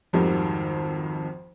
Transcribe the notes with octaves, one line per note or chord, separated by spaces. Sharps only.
G#1 F2 D#3 G3